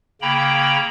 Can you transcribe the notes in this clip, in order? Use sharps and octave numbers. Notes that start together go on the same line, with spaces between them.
C#3 A#3 G5 A#5 B5